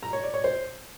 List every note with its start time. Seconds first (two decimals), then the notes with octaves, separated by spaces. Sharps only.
0.03 A#5
0.13 C#5
0.23 D5
0.34 C#5
0.44 C5